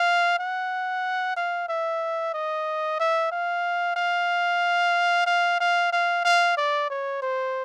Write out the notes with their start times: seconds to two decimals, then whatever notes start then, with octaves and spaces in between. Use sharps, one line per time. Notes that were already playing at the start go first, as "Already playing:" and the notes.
Already playing: F5
0.39 F#5
1.36 F5
1.68 E5
2.34 D#5
3.00 E5
3.32 F5
3.96 F5
5.26 F5
5.60 F5
5.92 F5
6.24 F5
6.57 D5
6.90 C#5
7.22 C5